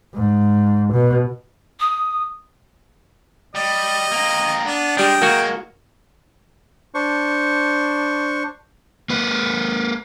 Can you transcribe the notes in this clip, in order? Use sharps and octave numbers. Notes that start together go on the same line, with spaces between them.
G#2
B2
D#6
G3 D#5
A#3 C4
B3 D4
G3 G#3 D4 G5 D#6
F#3 G#3 A#3 F#4
D4 C5 C#6
A#3 B4